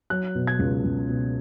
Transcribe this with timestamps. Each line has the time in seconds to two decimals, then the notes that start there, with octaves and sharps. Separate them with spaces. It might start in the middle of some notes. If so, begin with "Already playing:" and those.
0.10 F#3 F#6
0.35 B2
0.47 G#6
0.59 C#2
0.84 C#2
1.09 B2